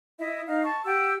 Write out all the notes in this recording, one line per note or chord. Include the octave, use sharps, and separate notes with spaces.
E4 D#5 E5
D#4 F5
A5 C#6
G4 F#5 G5 E6